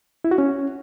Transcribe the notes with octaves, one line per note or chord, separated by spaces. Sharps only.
E4
F#4
C#4